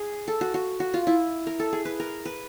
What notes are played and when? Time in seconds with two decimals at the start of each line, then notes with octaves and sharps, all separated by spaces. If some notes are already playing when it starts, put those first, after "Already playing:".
Already playing: G#4
0.28 A4
0.41 F#4
0.54 F#4
0.80 F#4
0.94 F4
1.07 E4
1.47 A#4
1.59 A4
1.72 G#4
1.85 B4
2.00 A#4
2.25 B4